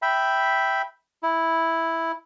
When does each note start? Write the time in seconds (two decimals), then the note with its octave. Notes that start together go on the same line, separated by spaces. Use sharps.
0.02 E5 G5 B5
1.23 E4